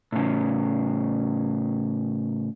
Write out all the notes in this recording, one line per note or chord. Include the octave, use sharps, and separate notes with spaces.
A2 C#3